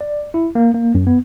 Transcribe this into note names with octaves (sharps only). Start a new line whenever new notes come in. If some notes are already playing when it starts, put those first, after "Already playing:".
D5
E4
A#3
A#3
F#2
B3